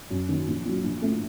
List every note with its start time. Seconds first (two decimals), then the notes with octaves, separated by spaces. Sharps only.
0.10 F#2
0.29 D#3 A#3
0.48 A#1
0.65 A#2 F#3
0.84 A#1
1.02 A2 A3